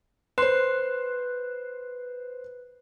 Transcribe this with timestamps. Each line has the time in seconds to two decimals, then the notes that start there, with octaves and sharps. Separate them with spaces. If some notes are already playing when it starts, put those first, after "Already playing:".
0.38 B4 C5 C6 F#6 C7